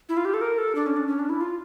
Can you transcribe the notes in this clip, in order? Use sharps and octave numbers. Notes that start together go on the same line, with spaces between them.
E4
F4
G4
A4
A#4
A4
D4
C#4
D4
C#4
D4
E4
F4